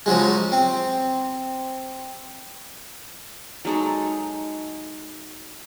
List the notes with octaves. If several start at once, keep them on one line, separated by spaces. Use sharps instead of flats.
C#3 F3 F#3 G#3
C4
F#3 G#3 D#4 A4